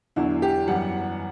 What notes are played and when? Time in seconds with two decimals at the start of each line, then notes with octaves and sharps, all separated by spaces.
0.16 E2 D3 F#3 E4
0.42 G4
0.67 F#2 E3 G3 F#5